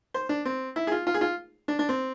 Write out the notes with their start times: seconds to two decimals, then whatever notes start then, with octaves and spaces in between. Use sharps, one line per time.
0.14 C5
0.29 D4
0.45 C4
0.76 E4
0.87 G#4
0.91 F4
1.07 F4
1.14 G#4
1.21 F4
1.68 D4
1.79 D4
1.89 C4